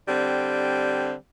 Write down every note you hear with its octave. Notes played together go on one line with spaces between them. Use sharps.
D3 G3 C4